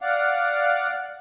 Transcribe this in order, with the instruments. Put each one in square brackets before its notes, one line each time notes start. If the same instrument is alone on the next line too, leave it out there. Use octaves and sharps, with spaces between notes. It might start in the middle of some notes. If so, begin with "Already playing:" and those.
[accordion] D5 F5 F#5